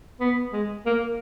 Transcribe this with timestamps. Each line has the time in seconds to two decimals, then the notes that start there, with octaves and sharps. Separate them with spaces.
0.20 B3
0.53 G#3
0.86 A#3